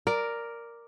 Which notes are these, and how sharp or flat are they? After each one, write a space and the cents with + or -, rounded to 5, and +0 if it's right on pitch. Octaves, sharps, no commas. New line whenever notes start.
A#4 +0 D5 +0